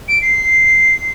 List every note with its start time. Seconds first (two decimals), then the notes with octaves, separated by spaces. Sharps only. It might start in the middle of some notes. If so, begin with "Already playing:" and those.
0.08 D7
0.22 C7